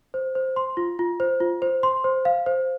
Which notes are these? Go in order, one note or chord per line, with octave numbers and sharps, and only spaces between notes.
C5
C5
C6
F4
F4
C5
F4
C5
C6
C5
F5
C5